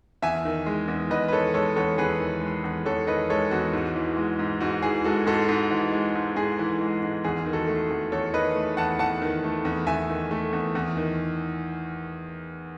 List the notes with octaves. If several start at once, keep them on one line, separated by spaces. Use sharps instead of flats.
E2 E5 G#5
D#3
G#3
E2
E2 B4 D#5
B4
D#3 A4 C#5
G#3 A4 C#5
E2 A4 C#5
E2 G#4 B4
D#3
G#3
E2
E2 A4 C#5
D#3 B4 D#5
G#3 A4 C#5
E2 F#4
G#2
E3
G#3
G#2
G#2 F#4
E3 G#4
G#3 F#4 A4
G#2 F#4 A4
G#2
E3
G#3
G#2
G#2 G#4
E3
G#3
G#2
E2 G#4
D#3
F#4 A4
A3
E2
E2 A4 C#5
D#3 B4 D#5
A3
E2 F#5 A5
E2 F#5 A5
D#3
A3
E2
E2 E5 G#5
D#3
A3
E2
E2
D#3